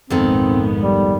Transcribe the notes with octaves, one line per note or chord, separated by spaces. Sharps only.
A#1 F2 G#2 D#3 B3 C4 A4
G3